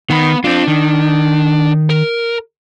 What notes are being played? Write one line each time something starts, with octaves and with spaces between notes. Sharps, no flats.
D#3 B3 B5
C4 D4 F4
D#3
A#4